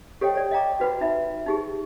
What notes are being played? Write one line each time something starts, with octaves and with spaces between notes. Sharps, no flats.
G4 A4 C#5 D#5 F#5 G5
C#5 D5
D#5 F5 G5 A#5 D6
F#4 B4 F#5 B5
D#4 E5 B5
D#4 G4 G#4